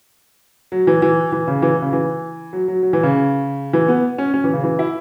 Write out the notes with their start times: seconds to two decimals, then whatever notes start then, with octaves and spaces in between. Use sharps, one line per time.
0.72 F#3
0.87 E3
1.02 E3
1.32 E3
1.48 C#3
1.62 E3
1.82 C#3
1.93 E3
2.53 F#3
2.68 F#3
2.83 F#3
2.93 E3
3.03 C#3
3.73 E3
3.88 B3
4.18 C#4
4.34 C#4
4.44 E3
4.53 C#3
4.64 E3
4.79 E4